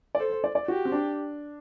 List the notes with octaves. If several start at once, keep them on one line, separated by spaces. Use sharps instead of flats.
D5
A4 C5
C5
D5
D5
F#4 G4
C4
D4